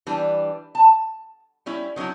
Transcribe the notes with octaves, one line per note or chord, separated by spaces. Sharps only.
E3 G3 D4
A5
G3 C#4 E4
D#3 F#3 C#4 D#4 E4